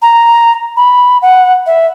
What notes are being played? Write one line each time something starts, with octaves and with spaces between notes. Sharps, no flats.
A#5
B5
F#5
E5